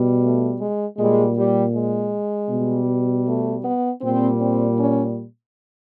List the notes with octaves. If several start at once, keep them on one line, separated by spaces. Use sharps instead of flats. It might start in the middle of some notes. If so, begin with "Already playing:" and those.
Already playing: B2 G3
A3
G#3
A#2 G3 G#3
G3
G#3
B2 G3
A3
B3
A#2 G3 C4
C4
C#4